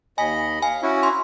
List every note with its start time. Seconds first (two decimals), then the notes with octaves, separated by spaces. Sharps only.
0.18 D#2 D#5 G#5 B5
0.62 F5 G#5
0.82 C#4 E4 F#4
1.03 C6